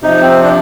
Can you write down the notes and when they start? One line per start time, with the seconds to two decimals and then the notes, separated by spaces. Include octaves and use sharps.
0.03 C3 F3 D#4
0.22 C4
0.43 D4